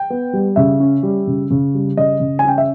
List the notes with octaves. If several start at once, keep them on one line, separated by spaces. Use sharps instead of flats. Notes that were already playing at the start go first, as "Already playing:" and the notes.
Already playing: G5
B3
G3
C#3 E5
C#4
G3
C#3
C#3
G3
C#3 D#5
C#3
G#5
C#4 G5
E5